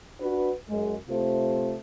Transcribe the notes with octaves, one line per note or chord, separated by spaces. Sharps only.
D4 F#4 B4
F#2 G#3
C3 A3 F4 C5